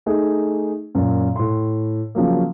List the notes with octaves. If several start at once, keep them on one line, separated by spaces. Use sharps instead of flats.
A3 D#4 G#4
F#2 A#2
A2 C6
C#3 F3 F#3 A#3